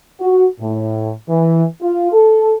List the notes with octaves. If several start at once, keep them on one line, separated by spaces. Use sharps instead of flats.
F#4
A2
E3
F4
A4